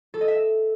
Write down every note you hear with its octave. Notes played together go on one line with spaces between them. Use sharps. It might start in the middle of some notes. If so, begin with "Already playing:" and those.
A4
D#5
E5